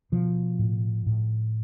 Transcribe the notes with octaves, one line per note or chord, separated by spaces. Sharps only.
B2 F3
A2
A2